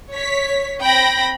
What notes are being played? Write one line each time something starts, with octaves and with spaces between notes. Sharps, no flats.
C#5 B6
C4 G5 B5 A#6